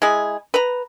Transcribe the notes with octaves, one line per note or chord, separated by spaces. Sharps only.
G#3 E4 G#4
B4 A#5